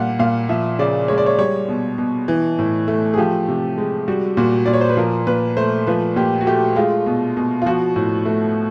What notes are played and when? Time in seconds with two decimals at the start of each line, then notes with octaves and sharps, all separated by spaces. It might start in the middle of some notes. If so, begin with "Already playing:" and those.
Already playing: A#2 G3 F5 F#5
0.19 A#2 F5
0.49 F3 E5
0.79 C#3 D5
1.08 G#3 C#5
1.18 D5
1.26 C#5
1.39 G3 C#5
1.68 B2
1.98 B2
2.28 E3
2.59 A2
2.88 A3
3.14 G#4
3.18 F3 G4
3.48 C3
3.78 G#3
4.08 G3 F#4
4.37 A#2 F#4
4.66 A#2 D5
4.73 C#5
4.81 C5
4.89 B4
4.97 F3 A#4
5.27 A#2 B4
5.57 A3 C5
5.87 F3 B4
6.16 A#2 G4
6.41 F#4
6.47 A3 G4
6.76 G#3 F4
7.06 B2
7.37 B2
7.62 F4
7.66 F3 F#4
7.96 A2
8.25 A3